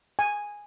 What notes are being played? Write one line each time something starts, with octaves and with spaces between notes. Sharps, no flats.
G#5